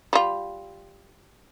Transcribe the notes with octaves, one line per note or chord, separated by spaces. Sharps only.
G3 F4